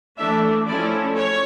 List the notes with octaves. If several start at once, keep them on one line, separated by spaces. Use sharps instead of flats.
E3 A3 D4 E5
F3 A3 C#4 E4 D5
C#5